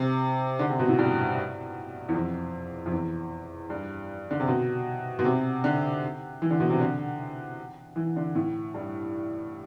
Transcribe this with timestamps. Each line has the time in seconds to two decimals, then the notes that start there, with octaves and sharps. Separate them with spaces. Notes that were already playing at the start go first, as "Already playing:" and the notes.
Already playing: C3
0.59 D3
0.70 C3
0.79 B2
0.88 A2
0.99 G2
2.09 E2
2.14 F2
2.86 F2
2.92 E2
3.70 G2
4.31 D3
4.40 C3
4.48 B2
5.19 B2
5.24 C3
5.64 D3
6.42 E3
6.50 D3
6.60 B2
6.70 C3
6.80 D3
7.96 E3
8.16 D3
8.35 A2
8.74 G2